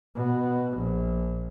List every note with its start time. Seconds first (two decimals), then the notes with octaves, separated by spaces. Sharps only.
0.16 B2
0.77 A#1